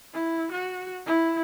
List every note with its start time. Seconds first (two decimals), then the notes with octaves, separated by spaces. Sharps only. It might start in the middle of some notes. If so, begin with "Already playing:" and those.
0.13 E4
0.52 F#4
1.06 E4